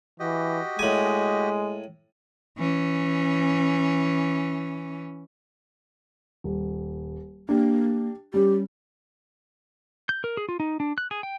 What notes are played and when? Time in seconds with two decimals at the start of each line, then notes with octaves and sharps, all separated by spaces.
0.20 E3 F#4 G4 D#5
0.79 A2 G#3 G#5
2.58 E3 C#4
6.44 D#1
7.49 A#3 D4 G4
8.34 G3 C#4 G4
10.09 G6
10.24 A#4
10.37 G#4
10.49 F4
10.60 D#4
10.80 D4
10.98 F#6
11.11 G#4
11.23 G5